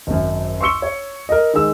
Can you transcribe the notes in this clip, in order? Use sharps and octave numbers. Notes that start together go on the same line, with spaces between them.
G#1 F#2
C6 C#6 E6 C#7 G7
C#5
A#4 D#5
D#3 G#3 E6